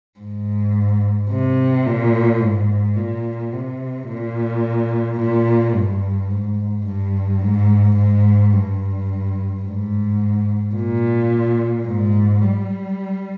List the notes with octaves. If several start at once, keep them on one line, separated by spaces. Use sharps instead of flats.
G#2
C3
A#2
G#2
A#2
C3
A#2
A#2
G2
G#2
G2
G#2
G#2
G2
G#2
A#2
G#2
G3